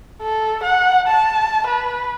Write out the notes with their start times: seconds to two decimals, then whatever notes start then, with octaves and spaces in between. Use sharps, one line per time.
0.22 A4
0.63 F#5
1.07 A5
1.67 B4